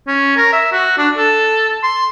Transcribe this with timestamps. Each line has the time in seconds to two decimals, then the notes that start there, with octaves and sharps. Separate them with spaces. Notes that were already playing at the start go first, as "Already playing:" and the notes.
0.08 C#4
0.37 A#4
0.53 E5
0.72 F#4
0.98 D4
1.17 A4
1.84 C6